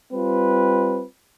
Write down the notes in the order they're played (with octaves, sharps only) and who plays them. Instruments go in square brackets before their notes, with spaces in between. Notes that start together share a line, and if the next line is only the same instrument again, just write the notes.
[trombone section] G3 C4 F4 B4